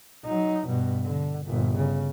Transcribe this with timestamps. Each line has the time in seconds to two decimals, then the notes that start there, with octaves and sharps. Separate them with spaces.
0.25 F#3 D#4
0.67 G2 B2
1.04 D3
1.45 G1 A#2
1.76 C#3